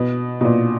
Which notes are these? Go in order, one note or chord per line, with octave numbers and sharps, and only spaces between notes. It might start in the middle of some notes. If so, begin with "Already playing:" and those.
Already playing: B2
B2
A#2